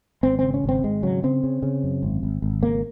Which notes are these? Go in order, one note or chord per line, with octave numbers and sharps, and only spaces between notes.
G#1 C4
C#3 C4
C#4
G#1 C4
G#1 G#3
C#3 F#3
C#3 C4
C#3
C#3
F#2
G#1
G#1
G#1
C#3 A#3